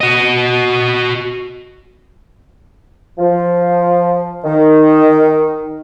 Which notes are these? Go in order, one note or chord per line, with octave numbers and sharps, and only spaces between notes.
F#4 D#5
F3
D#3